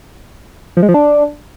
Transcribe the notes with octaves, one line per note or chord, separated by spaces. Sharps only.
F3
G#3
F3
D4